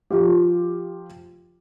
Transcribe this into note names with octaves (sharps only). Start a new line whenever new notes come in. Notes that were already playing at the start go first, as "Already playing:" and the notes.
F3 F4 G4